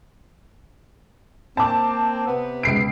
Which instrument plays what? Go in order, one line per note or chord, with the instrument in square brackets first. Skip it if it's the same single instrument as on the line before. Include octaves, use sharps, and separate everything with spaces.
[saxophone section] A#3 C4 [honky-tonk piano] A5 D6
[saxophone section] C3 B3
[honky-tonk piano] C#2 C7 D7